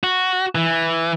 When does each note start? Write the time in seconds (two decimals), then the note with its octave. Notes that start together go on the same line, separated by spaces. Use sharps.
0.04 F#4
0.55 E3